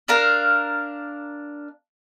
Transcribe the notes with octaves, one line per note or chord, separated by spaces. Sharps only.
D4 A#4 F5